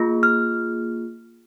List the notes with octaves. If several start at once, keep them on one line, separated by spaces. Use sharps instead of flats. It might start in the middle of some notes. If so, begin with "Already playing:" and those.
Already playing: A#3 F4 G#4
F6